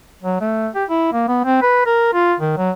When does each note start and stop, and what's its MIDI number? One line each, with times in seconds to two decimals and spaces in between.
0.23 0.40 54
0.41 0.68 57
0.75 0.85 67
0.90 1.11 64
1.13 1.24 58
1.28 1.44 59
1.45 1.60 60
1.62 1.86 71
1.86 2.09 70
2.14 2.34 65
2.40 2.54 51
2.58 2.71 54